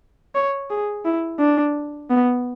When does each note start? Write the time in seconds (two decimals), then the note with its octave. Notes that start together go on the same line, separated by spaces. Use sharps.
0.35 C#5
0.70 G#4
1.05 E4
1.39 D4
2.10 B3